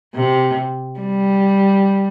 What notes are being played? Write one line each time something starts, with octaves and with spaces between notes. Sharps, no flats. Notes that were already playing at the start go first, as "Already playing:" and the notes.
C3
G3